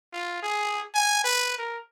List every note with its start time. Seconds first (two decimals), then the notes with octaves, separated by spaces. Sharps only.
0.13 F4
0.43 G#4
0.95 G#5
1.24 B4
1.58 A#4